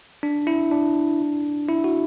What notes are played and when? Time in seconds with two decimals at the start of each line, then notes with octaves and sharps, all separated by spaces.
0.23 D4
0.47 E4
0.71 D4
1.69 E4
1.84 F#4